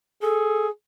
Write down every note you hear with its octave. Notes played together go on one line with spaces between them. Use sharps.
G#4 A4